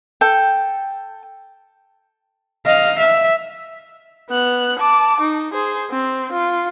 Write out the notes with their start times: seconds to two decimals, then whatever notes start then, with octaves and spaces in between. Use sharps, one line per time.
0.21 A4 G5
2.65 D#5 F5
2.98 E5
4.30 B3 F#6
4.80 A5 D6
5.21 D#4
5.53 G#4 C5
5.90 C4
6.32 F4